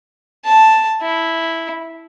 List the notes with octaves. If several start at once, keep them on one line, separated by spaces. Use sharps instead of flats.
A5
E4